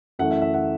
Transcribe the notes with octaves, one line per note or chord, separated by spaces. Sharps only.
F#2 E3 A3 F#5
E5
E5
F#5